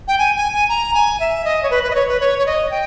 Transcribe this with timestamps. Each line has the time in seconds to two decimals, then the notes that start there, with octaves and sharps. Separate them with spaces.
0.08 G5
0.19 G#5
0.36 G#5
0.52 G#5
0.69 A#5
0.94 G#5
1.20 E5
1.45 D#5
1.63 C#5
1.70 B4
1.83 B4
1.91 D#5
1.95 C#5
2.08 B4
2.20 C#5
2.39 C#5
2.46 D#5
2.71 G5